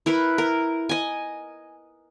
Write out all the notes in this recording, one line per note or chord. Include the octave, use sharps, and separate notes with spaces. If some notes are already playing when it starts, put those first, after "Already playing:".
E4 A#4 B4
A#4
D#5 G#5